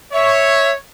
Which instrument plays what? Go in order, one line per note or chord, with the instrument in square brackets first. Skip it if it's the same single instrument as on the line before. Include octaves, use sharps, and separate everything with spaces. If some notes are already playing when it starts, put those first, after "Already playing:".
[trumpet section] C#5 [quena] E5